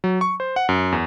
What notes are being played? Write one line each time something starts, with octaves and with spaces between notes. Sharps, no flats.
F#3
C#6
C5
F#5
F#2
E2